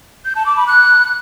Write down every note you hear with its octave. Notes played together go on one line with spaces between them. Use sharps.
G6
A5
D6
B5
F#6